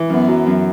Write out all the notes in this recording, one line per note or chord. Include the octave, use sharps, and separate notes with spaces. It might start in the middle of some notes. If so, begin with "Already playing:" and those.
Already playing: E3
F#2 B3
F#3
F#2